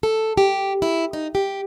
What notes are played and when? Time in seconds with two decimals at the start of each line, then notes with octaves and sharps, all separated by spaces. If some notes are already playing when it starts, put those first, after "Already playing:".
0.03 A4
0.37 G4
0.82 E4
1.13 D#4
1.35 G4